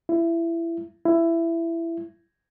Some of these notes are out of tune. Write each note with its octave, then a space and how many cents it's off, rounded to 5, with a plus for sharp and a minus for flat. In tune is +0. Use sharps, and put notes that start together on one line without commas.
E4 +20
E4 +15